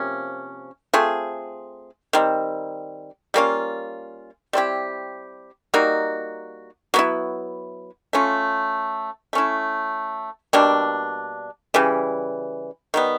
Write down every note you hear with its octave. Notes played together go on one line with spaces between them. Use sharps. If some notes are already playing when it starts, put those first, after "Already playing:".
Already playing: C3 F3 A#3 C#4
A3 C4 F4 G#4
D#3 G3 C4
G3 A#3 C#4 F4
G3 C4 E4 G4
G3 A#3 D#4 F#4
F#3 B3 E4
A3 C#4 F4
A3 C#4 E4
B2 G3 A#3 D4
C#3 E3 G3
D#3 G3 B3